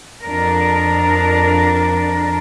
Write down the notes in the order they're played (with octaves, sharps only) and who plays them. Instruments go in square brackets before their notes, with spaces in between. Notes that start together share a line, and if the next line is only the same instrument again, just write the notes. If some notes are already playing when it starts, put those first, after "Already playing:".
[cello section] F2 D4 A#4